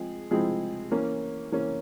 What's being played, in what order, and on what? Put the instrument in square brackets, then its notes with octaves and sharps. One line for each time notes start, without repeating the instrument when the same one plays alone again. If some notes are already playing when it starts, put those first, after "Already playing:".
Already playing: [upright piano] F3 G#3 C4 G#4
F3 G#3 C4 E4 G#4
E3 A#3 C#4
E3 A#3 C#4